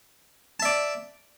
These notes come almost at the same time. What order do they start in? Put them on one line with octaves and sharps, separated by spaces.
A5 E5 D5